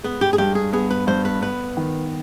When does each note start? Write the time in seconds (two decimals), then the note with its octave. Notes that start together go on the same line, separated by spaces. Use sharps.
0.04 G#3 B3
0.21 G4
0.33 G#4
0.38 G2 G4
0.55 G#4
0.73 B3 G#4
0.90 B4
1.07 G2 C5
1.25 B4
1.42 B3 B4
1.77 D#3